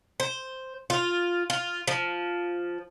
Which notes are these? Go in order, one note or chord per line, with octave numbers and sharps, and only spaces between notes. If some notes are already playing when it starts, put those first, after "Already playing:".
C5
F4
F4
F3